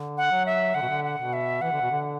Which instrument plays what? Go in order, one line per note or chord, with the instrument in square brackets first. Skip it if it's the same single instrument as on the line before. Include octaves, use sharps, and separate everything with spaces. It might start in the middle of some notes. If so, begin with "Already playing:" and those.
Already playing: [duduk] D3
[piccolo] F#5
[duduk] F#3
[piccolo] E5
[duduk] D3 [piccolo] F#5
[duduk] B2
D3
[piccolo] F#5
[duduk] B2
[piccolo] E5
[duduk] E3 [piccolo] F#5
[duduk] D3
B2
D3